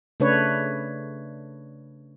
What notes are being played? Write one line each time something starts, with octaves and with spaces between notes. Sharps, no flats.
C#3 A3 D4 B4 C#5